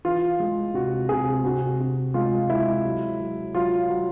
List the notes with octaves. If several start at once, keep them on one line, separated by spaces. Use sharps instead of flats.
E3 F4
G#3
C3 F#4
C3 G#4
C3 F#4
C3
G#3 F4
G#3 E4
F#3
F#3
F#3 F4
F#3